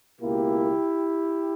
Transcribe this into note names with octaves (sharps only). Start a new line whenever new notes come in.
C#2 B2 A#3 E4 G4